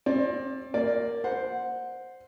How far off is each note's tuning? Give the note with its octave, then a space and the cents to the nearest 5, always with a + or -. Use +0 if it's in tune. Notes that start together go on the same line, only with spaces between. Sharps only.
C4 +30 D5 +0
A#3 +0 D5 +0
C5 +0 F#5 -15